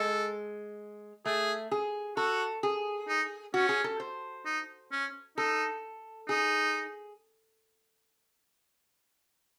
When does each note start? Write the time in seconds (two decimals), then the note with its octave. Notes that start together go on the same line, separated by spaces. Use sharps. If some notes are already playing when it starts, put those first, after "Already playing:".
Already playing: G#3 A4
1.25 A3 G#4
1.71 G#4
2.17 F#4 A4
2.63 G#4
3.08 D#4
3.54 C#4 F#4
3.69 G#4
3.84 A4
4.00 C5
4.46 D#4
4.92 C#4
5.38 D#4 A4
6.29 D#4 G#4